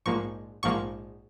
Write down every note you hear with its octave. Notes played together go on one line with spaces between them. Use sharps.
A#1 G#2 F3 A#3 C#6
A#1 G#2 F3 A#3 C#6